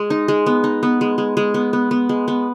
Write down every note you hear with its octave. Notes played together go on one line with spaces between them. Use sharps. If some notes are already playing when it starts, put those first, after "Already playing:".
Already playing: G#3
D#4
G#3
B3
D#4
B3
G#3
G#3
G#3
B3
B3
B3
G#3
B3